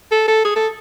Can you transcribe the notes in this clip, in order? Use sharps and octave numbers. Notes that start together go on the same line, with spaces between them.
A4
A4
G#4
A4